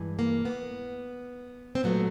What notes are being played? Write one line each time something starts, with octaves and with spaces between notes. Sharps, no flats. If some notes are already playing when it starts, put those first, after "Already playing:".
Already playing: G2 E3 G#3
A#3
B3
C4
A#2 F#3 A3 B3